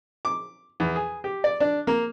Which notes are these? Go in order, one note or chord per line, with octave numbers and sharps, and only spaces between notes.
D6
E2
G#4
G4
D5
D4
A#3